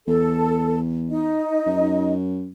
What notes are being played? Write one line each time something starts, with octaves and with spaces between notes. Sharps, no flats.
E2 A4
D#4 D#5
F#2